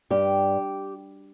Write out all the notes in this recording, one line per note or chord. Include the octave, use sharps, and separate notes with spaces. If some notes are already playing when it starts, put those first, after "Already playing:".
G2 G4